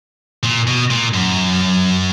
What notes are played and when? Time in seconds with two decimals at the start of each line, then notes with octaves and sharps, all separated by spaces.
0.44 A#2
0.67 B2
0.90 A#2
1.14 F#2